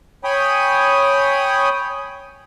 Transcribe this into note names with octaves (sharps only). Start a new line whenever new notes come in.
C#5 G5 G#5 B5 D#6